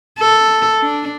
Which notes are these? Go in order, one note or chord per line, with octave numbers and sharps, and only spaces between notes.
A4
D4